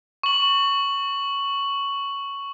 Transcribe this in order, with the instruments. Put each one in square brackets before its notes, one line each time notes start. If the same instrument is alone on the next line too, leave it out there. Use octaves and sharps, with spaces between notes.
[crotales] C#6 F#7